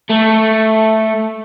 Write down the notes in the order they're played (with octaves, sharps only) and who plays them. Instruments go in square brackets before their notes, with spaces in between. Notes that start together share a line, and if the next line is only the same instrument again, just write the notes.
[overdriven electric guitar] A3